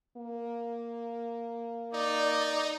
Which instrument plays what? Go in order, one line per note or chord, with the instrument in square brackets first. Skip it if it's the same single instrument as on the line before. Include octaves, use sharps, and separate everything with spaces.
[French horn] A#3
[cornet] D#4 [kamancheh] D5